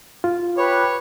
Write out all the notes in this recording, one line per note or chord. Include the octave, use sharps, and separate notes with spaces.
F4
G4 B4 C#5